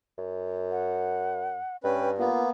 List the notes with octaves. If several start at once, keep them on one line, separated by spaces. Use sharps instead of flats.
F#2
F#5
G2 C#4 B4 G5
A#3 B3 F4